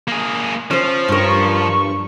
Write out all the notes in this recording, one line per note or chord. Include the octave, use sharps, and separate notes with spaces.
A#3 G#4
F3 C#4 C5
G2 C#4 A#4 C#6